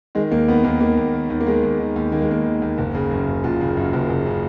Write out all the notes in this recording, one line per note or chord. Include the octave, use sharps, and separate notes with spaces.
D#3 G#3
D#2 A#3
D#3 B3
D#2 A#3
D#3 A#3
D#2
D#3
D#2
A#3
D#3 G#3
D#2
D#3
D#2
D#3 A#3
G#3
D#2 A#3
D#3
D#2
F#1
C#3
F#2
F#1
F#1 F4
C#3
F#2
F#1
F#1
C#3